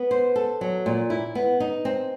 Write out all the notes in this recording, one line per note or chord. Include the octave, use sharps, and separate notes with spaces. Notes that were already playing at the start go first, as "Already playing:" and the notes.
Already playing: B3
C5
A4
F#3
A#2
E4
B3
D#4
C4